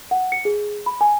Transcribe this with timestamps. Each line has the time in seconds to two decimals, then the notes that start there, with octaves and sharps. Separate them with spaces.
0.11 F#5
0.32 C#7
0.45 G#4
0.86 B5
1.01 G#5